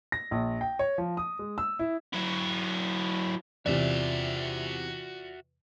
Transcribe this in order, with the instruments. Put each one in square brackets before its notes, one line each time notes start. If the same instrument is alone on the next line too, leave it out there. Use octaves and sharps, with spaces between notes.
[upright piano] A#6
A#1
G5
C#5
F3
D#6
G#3
E6
E4
[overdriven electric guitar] F#3 E4
[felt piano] E2 C3 [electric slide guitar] F4 D5 [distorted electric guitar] F#4 E5